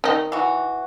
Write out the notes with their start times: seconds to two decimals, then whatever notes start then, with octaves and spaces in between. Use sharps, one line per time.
0.04 D#3 D#4
0.32 E3 F#4